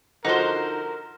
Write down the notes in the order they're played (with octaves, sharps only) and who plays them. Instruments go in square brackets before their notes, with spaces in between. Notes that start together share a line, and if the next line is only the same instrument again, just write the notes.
[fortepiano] D3 F3 F#4 [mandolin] D#4 C5 [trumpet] A#4